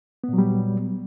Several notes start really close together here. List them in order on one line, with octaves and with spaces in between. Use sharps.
B3 A#2 F#3 G3